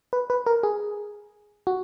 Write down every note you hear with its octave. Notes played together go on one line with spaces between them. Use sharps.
B4
B4
A#4
G#4
F#4